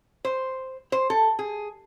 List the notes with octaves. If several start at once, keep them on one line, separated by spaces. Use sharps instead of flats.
C5
C5
A4
G#4